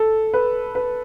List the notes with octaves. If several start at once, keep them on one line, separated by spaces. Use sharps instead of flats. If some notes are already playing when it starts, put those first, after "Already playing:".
Already playing: A4
B4
B4